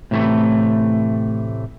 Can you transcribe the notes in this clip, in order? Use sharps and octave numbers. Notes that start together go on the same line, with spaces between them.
A2 C3 E3 G3 A3